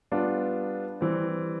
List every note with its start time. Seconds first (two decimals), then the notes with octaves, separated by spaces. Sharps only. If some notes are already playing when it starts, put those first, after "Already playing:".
0.12 G3 B3 D4 F4
1.01 E3 G3 C4